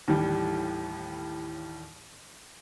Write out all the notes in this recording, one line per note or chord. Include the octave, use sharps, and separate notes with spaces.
D#2 A2 E3 G3